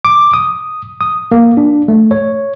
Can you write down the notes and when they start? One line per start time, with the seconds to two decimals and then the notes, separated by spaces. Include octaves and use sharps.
0.05 D6
0.33 D#6
1.01 D#6
1.32 A#3
1.57 D4
1.88 A3
2.11 C#5